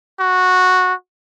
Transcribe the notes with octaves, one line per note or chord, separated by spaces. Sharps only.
F#4